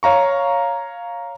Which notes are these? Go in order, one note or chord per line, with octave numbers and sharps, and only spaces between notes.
C#5 F5 A#5 C#6